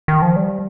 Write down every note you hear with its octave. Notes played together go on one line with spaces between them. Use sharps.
D#3
F3
G3